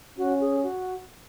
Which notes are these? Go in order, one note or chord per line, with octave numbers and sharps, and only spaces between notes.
C#4 F#4
G#4
F#4